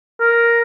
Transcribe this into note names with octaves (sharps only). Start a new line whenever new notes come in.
A#4